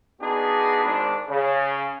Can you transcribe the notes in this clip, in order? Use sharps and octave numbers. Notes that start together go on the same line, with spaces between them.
B3 D4 D#4 F#4 G#4
G#1 D4
C#3